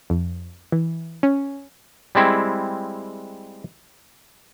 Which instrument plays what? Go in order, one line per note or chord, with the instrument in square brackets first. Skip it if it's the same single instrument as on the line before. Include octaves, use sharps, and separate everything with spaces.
[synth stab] F2
E3
C#4
[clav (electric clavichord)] G3 G#3 C4 E4